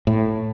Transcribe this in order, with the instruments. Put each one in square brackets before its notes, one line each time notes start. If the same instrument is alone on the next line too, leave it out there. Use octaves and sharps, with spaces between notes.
[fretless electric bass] A2